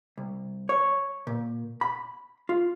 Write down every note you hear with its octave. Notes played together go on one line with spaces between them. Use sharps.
C2
C#5
A#2
B5
F4